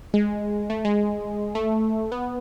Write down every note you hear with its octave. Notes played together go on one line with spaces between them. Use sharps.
G#3
A3
G#3
A3
B3